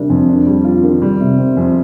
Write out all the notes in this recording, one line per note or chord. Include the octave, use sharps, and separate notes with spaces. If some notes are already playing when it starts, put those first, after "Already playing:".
Already playing: C3 D#3 G3 D4
F2
D4
G3
F4
D#3
G3
C3
C4
F2